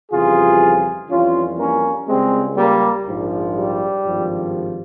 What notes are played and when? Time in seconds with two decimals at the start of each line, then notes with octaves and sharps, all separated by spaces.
0.12 F2 C#3 E3 G3 F4 G#4
1.10 F2 E3 G3 C#4 F4
1.59 A#3 C#4
2.08 C#2 C#3 G3 G#3 C4
2.57 G3 A#3
3.08 A#1 G#2 F3
3.57 G3
4.06 G#1 G2 F3